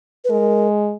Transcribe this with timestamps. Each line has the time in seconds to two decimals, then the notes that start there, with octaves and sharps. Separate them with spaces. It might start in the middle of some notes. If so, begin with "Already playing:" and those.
0.24 B4
0.30 G#3 A#4